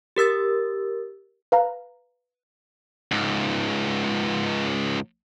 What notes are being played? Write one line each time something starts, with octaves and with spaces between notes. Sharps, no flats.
G4 A#4 E6 A6
B4 F5 A#5
C#2 G#2